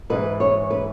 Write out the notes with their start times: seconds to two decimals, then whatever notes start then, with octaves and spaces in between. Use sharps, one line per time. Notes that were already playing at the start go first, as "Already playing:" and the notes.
0.10 G#2 E3 B4
0.40 C#5
0.70 B4